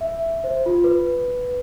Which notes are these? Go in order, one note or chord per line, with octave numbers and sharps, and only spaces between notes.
E5
C5
F4
B4